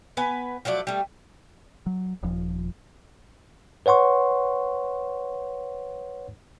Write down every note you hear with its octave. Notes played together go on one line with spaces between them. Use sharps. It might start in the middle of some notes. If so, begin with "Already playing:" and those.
B3 B4 G#5
F3 F#3 A3 D4
G3 A3
F#3
D#1 F3
B4 C#5 F#5 C6 C#6